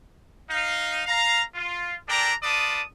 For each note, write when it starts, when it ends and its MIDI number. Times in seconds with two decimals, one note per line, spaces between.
0.50 1.02 63
0.50 1.02 77
1.07 1.42 77
1.07 1.42 82
1.55 1.96 65
2.09 2.32 62
2.09 2.32 69
2.09 2.32 70
2.09 2.32 74
2.09 2.32 79
2.09 2.32 82
2.43 2.82 65
2.43 2.82 71
2.43 2.82 74
2.43 2.82 81
2.43 2.82 87